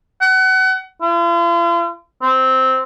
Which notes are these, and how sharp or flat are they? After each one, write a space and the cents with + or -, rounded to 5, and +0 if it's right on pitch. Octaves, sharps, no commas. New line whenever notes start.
F#5 +30
F4 -45
C4 -5